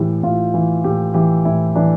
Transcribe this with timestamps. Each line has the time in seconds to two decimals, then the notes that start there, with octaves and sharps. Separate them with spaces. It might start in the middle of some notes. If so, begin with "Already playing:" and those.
Already playing: A2 E3 G4
0.23 A2 F4
0.54 E3
0.84 A2 G4
1.14 E3 G4
1.45 A2 E4
1.75 E3 D4